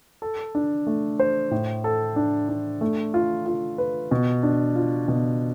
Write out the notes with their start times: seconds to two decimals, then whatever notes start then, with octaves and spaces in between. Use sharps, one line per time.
0.22 A4
0.55 D4
0.87 A3
1.19 C5
1.51 A2
1.84 A4
2.16 D4
2.49 D4
2.81 A3
3.14 F4
3.46 F4
3.78 B4
4.11 B2
4.43 D4
4.76 F4
5.08 B2